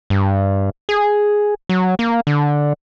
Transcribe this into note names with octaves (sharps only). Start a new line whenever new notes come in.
G2
G#4
F#3
A#3
D3